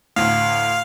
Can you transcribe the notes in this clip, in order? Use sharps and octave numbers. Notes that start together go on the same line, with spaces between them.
D2 A2 F5